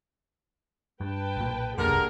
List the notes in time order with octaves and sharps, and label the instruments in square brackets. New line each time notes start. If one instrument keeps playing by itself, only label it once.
[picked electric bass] G2 [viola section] B4 G5 A5
[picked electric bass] B1 A#2
[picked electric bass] E1 C2 F#2 [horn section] D3 G4 A#4 [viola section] A#3 G#4